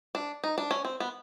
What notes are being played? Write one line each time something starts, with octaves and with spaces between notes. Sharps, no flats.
D4
D#4
D4
C#4
C4
B3